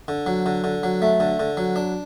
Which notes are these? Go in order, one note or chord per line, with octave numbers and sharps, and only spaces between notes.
D3
F#3
D3
D3
F#3
A3
D3
D3
F#3
D4